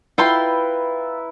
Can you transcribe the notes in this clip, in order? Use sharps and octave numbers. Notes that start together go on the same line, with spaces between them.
E4 F4 B4 G5 A#5 C6